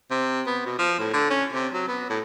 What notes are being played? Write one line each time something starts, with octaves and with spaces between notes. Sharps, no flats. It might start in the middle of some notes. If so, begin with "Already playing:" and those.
C3
B3
B2
F3
A2
D3
C#4
C3
F#3
B3
A2